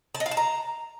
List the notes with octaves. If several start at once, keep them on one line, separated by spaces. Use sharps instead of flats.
A5
D#5
F5
A5
A#5